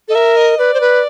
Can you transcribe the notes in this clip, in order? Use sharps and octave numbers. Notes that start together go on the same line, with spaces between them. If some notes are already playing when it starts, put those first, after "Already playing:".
A4 D#5
A#4 E5
D#5
B4 D5
C5
B4